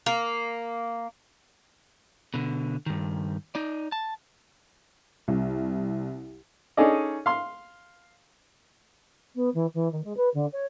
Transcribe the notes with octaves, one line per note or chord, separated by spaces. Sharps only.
A#3
B2 D3
G2 D#3
D#4 D5
A5
C2
C#4 D#4 G#4 A4 D5 D#5
F5 C6
B3
E3
E3
D#3
G#3
B4
D3
C#5